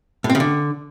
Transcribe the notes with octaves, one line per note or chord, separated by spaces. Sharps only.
A2
C4
C#3
D3